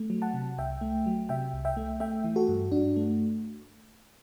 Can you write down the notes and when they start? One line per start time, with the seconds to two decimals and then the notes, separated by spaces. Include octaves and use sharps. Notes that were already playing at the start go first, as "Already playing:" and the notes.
Already playing: A3
0.10 F#3
0.22 F#5 A5
0.34 C3
0.58 C2 E5 G5
0.81 A3
1.06 F#3
1.29 C3 E5 G5
1.53 C2
1.65 E5 G5
1.77 A3
2.00 A3 E5 G5
2.24 E3
2.36 F#4 A4
2.48 G2
2.72 G2 D4 F#4
2.96 A3